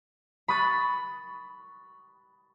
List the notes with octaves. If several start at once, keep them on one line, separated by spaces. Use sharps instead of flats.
B5 C#6 D#6 F#6 A6 B6